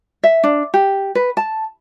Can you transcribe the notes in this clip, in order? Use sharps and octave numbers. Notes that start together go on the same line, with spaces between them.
E5
D4
G4
B4
A5